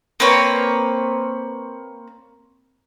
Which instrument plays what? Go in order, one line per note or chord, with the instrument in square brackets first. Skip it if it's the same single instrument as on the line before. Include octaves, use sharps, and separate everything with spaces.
[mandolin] A#3 C4 B4 C#5